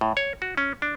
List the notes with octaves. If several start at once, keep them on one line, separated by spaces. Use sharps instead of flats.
A2
C#5
F#4
C#4
D4